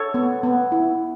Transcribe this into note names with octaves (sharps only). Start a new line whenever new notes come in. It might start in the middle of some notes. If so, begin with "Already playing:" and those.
Already playing: A4 C#5
B3
B3
E4